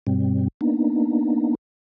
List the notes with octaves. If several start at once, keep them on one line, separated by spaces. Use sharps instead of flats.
G2 B2 G3 C4
A#3 B3 D4 D#4